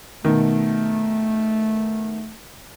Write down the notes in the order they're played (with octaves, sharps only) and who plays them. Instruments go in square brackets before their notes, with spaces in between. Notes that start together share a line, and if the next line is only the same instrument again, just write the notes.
[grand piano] B2 D#3 [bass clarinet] A3